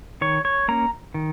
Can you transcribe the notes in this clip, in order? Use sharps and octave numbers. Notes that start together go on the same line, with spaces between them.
D#3 C#5
C#5
A#3 C#4 A#5
D#3